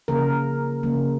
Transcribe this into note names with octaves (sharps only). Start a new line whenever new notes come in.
C#3 F3 A#3 A#4
C#3 F3 A#3